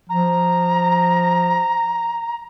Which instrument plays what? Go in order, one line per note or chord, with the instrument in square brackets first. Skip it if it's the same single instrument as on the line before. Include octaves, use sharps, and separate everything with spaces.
[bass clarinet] F3 [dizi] A#5